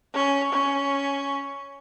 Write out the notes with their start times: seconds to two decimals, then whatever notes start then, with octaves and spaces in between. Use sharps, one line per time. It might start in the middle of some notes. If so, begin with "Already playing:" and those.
0.14 C#4
0.53 C#4